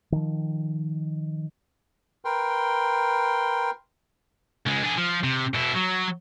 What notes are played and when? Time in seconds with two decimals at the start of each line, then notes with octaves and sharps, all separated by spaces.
0.12 D#3 F3
2.25 A#4 B4 G5 C6
4.67 C#2 G#3
4.84 D4 G#4
4.98 F3
5.24 C3
5.54 B2 E4
5.75 F#3